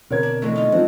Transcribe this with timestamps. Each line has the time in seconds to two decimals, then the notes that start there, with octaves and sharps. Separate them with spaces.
0.10 B2 D3 C4 A#4 C#5 G#6
0.23 D4
0.42 E3 F#3 G#3 A3
0.56 D#4 F4
0.72 D3 F3 G#3 C4 F#4